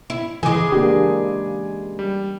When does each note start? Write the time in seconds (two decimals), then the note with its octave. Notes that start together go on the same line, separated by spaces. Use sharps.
0.10 E4
0.43 C#3 E3 G#3 G#5 D6
0.72 A#3 D4 G4
1.99 G3